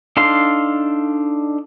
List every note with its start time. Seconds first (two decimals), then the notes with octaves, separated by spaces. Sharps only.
0.17 D4 D#4 A4 F5 C6